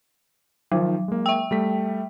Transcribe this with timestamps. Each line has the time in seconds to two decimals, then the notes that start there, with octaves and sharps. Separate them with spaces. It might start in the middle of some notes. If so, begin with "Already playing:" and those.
0.72 D#3 F3 F#3 C5
1.08 G#3 A#3
1.26 E5 G5
1.51 G3 A3 B6